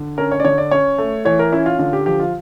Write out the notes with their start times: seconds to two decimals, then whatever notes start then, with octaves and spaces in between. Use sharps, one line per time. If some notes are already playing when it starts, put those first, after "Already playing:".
Already playing: D3
0.18 C#4 A#4
0.32 C#5
0.40 D5
0.45 D3 C#5
0.58 D5
0.71 C#4 C#5
0.98 A3
1.25 E3 C#5
1.39 A#4
1.52 C#4 E4
1.66 F4
1.79 D3 F4
1.93 G4
2.06 F3 G4
2.20 F4